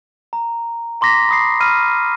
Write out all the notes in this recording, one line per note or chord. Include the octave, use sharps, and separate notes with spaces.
A#5
A#5 C6 D6 A#6 B6
B5 D#6 C7
B5 F6 D#7